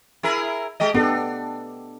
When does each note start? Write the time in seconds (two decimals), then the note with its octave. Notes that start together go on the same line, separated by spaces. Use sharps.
0.23 E4 G#4 A#4
0.80 G#3 G4 D#5
0.94 B3 D4 G4 A4